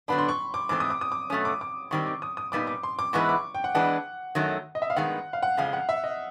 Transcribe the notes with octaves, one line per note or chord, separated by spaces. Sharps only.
D3 F#3 B3 D4 B5
C6
C#6
D6
G#2 E3 A3 C4 D6
D#6
D6
D#6
D6
B2 F#3 A3 C#4 D#6
D6
D6
G#2 D#3 G3 C4 C#6
D6
D#6
D#6
A#2 G3 B3 D#4 D6
D6
C6
D6
G#2 E3 G#3 B3 E4 C#6
D6
G5
F#5
E3 G#3 B3 D4 F#5
F#2 D#3 F#3 A3
D#5
E5
F5
G2 D#3 G#3 B3 F#5
F5
F#5
F2 C#3 F3 G#3 F5
F#5
E5
D#5